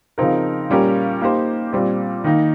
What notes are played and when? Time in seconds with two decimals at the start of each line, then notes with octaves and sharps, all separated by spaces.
0.18 C#3 F3 C4 D#4 A#4
0.69 A#2 G3 C#4 G4 A#4
1.21 A#3 D#4 G4 C5
1.73 A#2 G3 C4
2.24 D#3 A#3 D#4